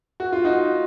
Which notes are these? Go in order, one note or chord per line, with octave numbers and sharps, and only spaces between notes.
F#4
F4
D#4 F#4